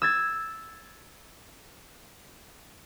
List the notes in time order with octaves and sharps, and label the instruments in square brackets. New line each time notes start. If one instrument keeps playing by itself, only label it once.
[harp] E6 G#6 A6